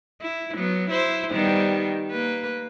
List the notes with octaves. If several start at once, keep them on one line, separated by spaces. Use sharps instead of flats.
E4
F#3 B3
E4 C5
D#3 G3 B3
A#3 B4